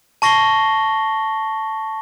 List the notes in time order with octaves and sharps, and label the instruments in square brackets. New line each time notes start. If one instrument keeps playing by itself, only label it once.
[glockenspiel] A5 C#6 A#6 C7 G7